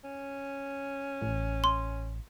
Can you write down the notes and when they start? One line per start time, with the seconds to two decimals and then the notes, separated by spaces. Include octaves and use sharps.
0.04 C#4
1.22 A1
1.64 C6